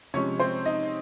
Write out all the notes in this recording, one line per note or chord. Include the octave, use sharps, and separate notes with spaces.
C3 F3 G#3 C#4 C#5
C4 C5
D#4 D#5